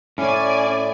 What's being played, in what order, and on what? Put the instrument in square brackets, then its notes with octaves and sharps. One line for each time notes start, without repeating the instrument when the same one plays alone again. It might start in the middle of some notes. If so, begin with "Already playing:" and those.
[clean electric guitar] A2 [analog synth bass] C#4 [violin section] D5 G#5